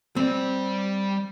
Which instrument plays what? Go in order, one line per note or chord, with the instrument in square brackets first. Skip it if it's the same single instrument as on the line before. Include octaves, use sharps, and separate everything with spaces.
[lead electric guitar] G3 D5 [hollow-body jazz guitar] C4